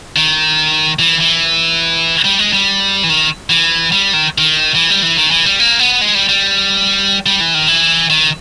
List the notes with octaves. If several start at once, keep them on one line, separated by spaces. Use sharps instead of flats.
D#3
E3
E3
G3
G#3
G3
E3
D#3
E3
G3
D#3
D#3
E3
G3
E3
D#3
E3
G3
A#3
B3
G#3
G3
G3
G3
E3
D#3
E3
D#3